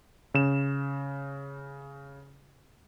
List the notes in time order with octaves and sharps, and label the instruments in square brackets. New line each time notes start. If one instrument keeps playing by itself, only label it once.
[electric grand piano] C#3 E7